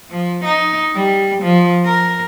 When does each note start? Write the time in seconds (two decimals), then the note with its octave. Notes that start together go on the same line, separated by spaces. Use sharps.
0.11 F3
0.44 D#4
0.96 G3
1.43 F3
1.85 A#4